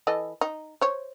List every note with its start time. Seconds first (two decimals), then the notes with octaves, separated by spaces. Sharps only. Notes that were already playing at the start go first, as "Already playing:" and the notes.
0.07 E3 A4 D#5
0.41 D#4
0.81 C5 C#5